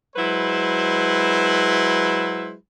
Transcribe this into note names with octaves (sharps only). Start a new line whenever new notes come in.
F#3 G#3 E4 B4 C5